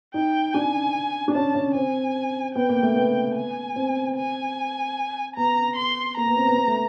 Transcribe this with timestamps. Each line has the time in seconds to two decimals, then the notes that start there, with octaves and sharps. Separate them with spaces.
0.14 D#4 G5
0.54 D4 G#5
1.28 D4
1.35 C#4 A5
1.55 C#4
1.75 C4 G#5
2.55 B3 G5
2.69 A#3
2.82 A3
2.95 B3
3.36 G#5
3.76 C4
4.16 G#5
5.36 B3 A#5
5.76 C6
6.17 A#3 A#5
6.27 B3
6.37 C4
6.47 B3
6.57 B3
6.67 A3